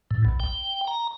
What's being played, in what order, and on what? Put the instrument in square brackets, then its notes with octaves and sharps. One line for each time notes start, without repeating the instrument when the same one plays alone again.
[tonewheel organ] A2
B1
G5
A#5